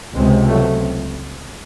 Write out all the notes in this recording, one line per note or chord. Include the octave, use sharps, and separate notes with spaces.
C#2 C3 G#3 C4
F#3 A3